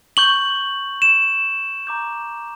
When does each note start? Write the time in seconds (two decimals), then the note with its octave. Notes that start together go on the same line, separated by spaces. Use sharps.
0.17 C#6 G6 F#7
1.02 E7
1.87 A#5 D6 G6